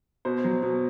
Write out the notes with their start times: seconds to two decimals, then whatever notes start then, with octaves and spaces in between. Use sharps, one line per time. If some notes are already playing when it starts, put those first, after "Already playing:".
0.25 B2 C5
0.44 F#3
0.63 B2